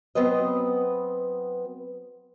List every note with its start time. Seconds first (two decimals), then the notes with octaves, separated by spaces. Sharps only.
0.15 F#3 B3 C4 B4 D#5